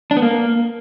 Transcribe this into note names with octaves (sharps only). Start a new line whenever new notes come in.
D4
B3
A#3